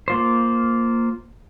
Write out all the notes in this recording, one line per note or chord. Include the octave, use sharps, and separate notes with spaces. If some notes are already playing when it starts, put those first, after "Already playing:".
A#3 F4 C5